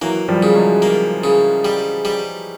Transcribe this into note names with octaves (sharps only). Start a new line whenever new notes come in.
E3 F#3 A#3
F3 G3
C#3
F#3 G#3
A#3
C#3
G3
G3